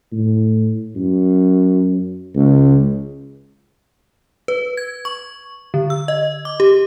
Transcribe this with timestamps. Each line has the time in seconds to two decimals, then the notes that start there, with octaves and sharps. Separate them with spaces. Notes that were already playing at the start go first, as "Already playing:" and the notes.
0.12 A2
0.96 F#2
2.35 C#2
4.48 B4
4.77 G#6
5.05 C#6
5.74 D3
5.90 E6
6.08 D#5
6.45 D6
6.60 G4